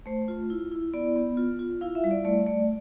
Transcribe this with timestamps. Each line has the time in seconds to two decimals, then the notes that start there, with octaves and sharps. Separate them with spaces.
0.06 A3 C5
0.28 F4
0.50 E4
0.72 E4
0.94 B3 D5
1.16 B3
1.37 F4
1.59 F4
1.81 E4 F5
1.95 E5
2.04 G3
2.11 D5
2.24 A3 D5
2.46 A3 D5